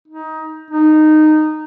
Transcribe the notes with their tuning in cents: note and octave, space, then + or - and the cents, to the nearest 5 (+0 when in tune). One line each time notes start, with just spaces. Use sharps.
D#4 +20
D#4 -15